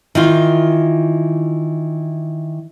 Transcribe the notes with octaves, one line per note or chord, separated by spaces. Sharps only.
D#3 E3 F4